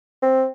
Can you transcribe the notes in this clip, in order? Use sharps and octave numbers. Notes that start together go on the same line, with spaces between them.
C4